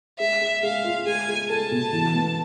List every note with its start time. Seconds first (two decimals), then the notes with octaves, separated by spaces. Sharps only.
0.20 G#3 E5
0.41 G#3
0.63 G#3 F5
0.84 F4
1.06 G#3 G#5
1.29 G#3
1.50 A4 A5
1.71 B2
1.93 E3
2.15 B3